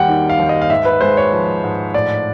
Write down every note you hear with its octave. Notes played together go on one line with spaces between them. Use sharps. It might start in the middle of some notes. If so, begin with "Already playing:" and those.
Already playing: D#2 G3 F#5 G5
D#3
F5
D#2
D#5
F5
G#2 E5
B4
G#3 C5
C#5
F3
G#2
A2 D5